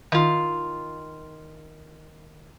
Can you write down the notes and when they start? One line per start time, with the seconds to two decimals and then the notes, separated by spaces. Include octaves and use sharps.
0.12 D#3 F4